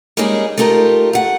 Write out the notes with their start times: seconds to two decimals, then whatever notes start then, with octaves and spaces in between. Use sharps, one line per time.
0.17 G3 G#3 A#3 C#4 D#4 G#4
0.58 A3 D#4 F4 G4 A#4
1.13 A3 F#5